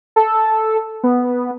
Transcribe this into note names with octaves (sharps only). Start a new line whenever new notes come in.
A4
B3